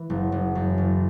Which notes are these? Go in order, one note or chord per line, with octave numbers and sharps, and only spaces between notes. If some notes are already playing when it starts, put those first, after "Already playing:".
Already playing: E3
F#1
F#1
F#2
F#1